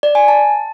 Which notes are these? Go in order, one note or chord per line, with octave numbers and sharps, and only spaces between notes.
D5
G#5
A5